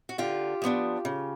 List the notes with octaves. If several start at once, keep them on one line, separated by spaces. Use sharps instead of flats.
F#4
D3 F4 G4
F3 G#3 B3 D4
C#3